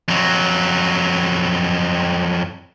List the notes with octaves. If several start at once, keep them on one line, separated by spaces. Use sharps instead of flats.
F2 F#3